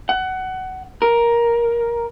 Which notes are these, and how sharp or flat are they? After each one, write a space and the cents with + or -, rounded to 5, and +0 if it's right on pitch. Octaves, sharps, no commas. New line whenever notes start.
F#5 +20
A#4 +10